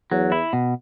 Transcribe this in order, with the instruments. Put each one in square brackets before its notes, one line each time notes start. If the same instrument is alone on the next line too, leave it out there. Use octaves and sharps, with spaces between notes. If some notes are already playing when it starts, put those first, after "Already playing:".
[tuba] E2 [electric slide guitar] F#3
[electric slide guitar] E4
B2